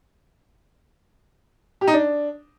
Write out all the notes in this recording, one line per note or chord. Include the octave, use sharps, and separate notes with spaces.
G4
D#4
D4